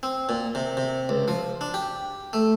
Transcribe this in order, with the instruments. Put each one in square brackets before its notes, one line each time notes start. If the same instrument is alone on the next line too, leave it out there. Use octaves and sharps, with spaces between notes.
[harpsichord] C4
A#2
C3
C3
C#2
F3
D4
G4
A3